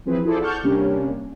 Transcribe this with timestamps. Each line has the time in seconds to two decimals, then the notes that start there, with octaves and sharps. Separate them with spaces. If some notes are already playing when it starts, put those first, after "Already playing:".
0.06 E3 F3 C4 G#4 B4
0.25 E4 F4 G#4 A4 C5 D5
0.41 D5 F#5 A5 C#6 F6 G6
0.64 C3 G3 A#3 C#4 D4